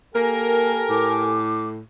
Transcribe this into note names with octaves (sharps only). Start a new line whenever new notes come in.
A#3 G4 A4 A#4 G#5
A2 D6